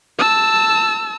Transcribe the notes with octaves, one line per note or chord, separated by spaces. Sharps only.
A5 E6